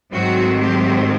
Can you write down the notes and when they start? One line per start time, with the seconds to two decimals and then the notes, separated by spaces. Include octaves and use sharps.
0.13 G#2 D#3 F#3 A3 C4 F#4
0.60 G4